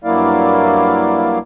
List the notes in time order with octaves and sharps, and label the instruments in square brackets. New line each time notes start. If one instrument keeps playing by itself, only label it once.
[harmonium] G2 F#3 A#3 E4 D5 F5